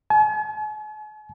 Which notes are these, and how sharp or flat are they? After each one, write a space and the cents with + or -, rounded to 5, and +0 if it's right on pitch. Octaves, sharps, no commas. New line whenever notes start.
G#5 +45